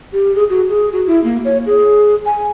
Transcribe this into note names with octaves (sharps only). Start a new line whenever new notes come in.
G4
G#4
F#4
G#4
F#4
E4
A#3
C#5
G#4
G#5